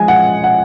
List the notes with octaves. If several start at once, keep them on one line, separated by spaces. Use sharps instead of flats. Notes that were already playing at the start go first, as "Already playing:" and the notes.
Already playing: F3 G#3 G#5
F#5
F#5